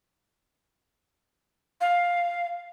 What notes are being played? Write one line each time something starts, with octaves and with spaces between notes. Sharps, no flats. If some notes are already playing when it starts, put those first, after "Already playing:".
F5